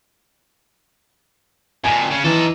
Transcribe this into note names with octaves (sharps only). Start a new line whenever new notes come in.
F2 A#2 G#5
C#3 C#4
E3 D#4 A4